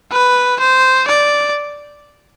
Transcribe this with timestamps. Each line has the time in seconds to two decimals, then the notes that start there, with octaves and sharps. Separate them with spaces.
0.12 B4
0.60 C5
1.08 D5